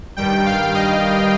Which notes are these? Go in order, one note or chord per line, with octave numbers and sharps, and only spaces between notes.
G2 D#3 G3 G5
F5
D#5